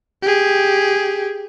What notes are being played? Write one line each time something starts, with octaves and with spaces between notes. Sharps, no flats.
G4 G#4